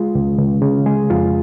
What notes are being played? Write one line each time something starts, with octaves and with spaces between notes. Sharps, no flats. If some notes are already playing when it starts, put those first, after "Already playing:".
Already playing: G#3 F4
C#2
C#2
C#3
G#3 G#4
F2 F4